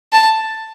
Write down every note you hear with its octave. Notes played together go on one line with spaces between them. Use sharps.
A5